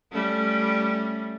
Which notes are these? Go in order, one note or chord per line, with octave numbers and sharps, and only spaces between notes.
G3 A3 C#4